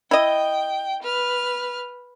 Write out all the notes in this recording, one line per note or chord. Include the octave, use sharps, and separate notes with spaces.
E4 D#5 G5
B4 F6